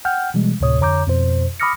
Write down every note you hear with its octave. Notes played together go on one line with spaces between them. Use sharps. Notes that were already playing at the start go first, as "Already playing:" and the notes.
F#5 G5 F6 G6
B2 E3 G3 G#3
D2 A2 C3 C#5 D#6
F2 D3 C#5 A#5 D6 G6
F2 B2 C5
B5 D6 D#6 F6 A#6 C#7